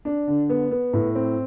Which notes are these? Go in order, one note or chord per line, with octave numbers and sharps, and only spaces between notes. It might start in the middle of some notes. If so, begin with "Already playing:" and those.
D4
D3
B3
B3
A2
C4